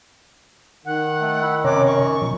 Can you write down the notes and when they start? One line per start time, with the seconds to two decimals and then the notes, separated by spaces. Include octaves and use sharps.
0.85 D#3 F#5
1.21 A3
1.42 E4
1.64 F#2 C3 C#5 A#5 D6
1.86 C#6
2.22 B2 F3